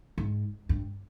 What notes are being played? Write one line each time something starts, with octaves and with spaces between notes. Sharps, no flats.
G#2
G2